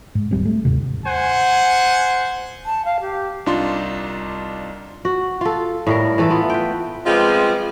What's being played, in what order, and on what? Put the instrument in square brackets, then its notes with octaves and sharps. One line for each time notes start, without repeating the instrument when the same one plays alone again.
[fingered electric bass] G#2
D#1 G3 C4
A3
D#2 G#2 C3
[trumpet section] C5 F#5 G#5
[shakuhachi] A5
F5
G4
[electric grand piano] C2 D4 D#4 F4 C6
[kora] F#4
F4 A4
A2 G3 A#4
E3 A3 A4
B3 F4
B4 G5
[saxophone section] F3 G3 G#3 B3 C4 F4